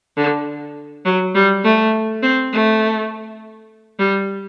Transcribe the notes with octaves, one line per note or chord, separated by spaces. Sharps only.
D3
F#3
G3
A3
C4
A3
G3